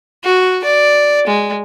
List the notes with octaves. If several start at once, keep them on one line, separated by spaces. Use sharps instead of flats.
F#4
D5
G#3